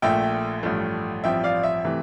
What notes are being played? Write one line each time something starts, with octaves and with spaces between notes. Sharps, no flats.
A#1 A#2 A3 E5 G5
A1 G2 F3 A3
A1 G2 F3 C4 E5 G5
D5 F5
E5
C3 E3 A3